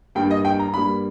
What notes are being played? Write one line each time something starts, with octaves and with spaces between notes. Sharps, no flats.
G2 G3 A#3 G5
D#5
G5
A#5
G2 G3 A#3 B5